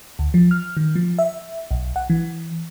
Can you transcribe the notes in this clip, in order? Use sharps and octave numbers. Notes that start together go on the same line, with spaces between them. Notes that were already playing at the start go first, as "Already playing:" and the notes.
D2
F3
F6
D#3
F3
E5
B1
F#5
E3